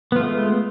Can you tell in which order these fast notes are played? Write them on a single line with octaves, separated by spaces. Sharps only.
B3 F4 A3 G#3